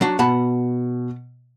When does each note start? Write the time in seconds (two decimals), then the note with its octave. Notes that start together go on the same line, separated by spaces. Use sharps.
0.01 F#3 D4 F#4
0.19 B2 F#5 A5 B5